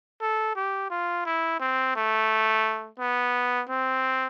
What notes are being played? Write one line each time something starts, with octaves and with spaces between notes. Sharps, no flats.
A4
G4
F4
E4
C4
A3
B3
C4